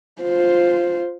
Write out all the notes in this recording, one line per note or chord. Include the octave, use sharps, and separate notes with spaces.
F4 C5